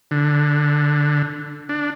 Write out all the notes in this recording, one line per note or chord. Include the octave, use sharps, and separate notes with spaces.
D3
D4